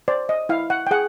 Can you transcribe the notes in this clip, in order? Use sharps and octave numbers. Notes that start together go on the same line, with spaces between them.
C5 D5
D#5
E4 F5
F#5
G5
G#4 F#5